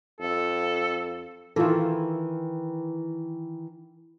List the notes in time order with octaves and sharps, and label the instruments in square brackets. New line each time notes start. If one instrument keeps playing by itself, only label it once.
[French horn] F2 [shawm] A4
[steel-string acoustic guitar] D#3 E3 [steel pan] E4 F4 A4